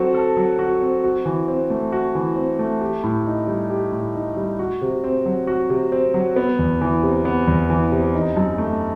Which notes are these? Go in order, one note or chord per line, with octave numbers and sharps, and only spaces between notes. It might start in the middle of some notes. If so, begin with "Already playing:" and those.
Already playing: F#3 C4 F#4 A4
A4
F#3
F#4
C4
F#4
E3
C4
A3
F#4
E3
C4
A3
G4
A2
D#4
G3
G4
A2
D#4
G3
F#4
C3
C4
F#3
F#4
C3
C4
F#3
B3
E2
E3
C3
B3
E2
E3
C3
D#4
F#2
A3